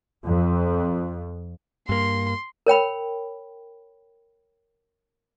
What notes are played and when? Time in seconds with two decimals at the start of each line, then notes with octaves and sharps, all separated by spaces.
0.25 F2
1.89 G2 A#3 C6
2.66 A#4 C#5 G5 B5